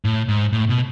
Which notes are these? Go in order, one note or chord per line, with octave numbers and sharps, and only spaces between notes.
A2
G#2
A2
B2